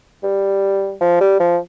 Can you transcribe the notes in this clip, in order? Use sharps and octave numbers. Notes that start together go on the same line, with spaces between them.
G3
F3
G3
F3